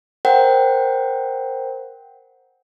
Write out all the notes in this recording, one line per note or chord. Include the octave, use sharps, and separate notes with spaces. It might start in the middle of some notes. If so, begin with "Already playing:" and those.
A#4 C5 F#5 G5